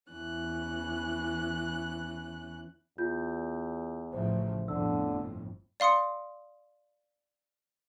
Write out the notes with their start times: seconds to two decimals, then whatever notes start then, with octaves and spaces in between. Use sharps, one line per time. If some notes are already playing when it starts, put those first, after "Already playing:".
0.11 E2 E3 C#4 F#6
2.98 E2 F4 G6
4.13 A1 C#3 F3 C5 E5
4.68 G1 F2 A2 D3 E6
5.80 D5 F5 C6 D#6 C#7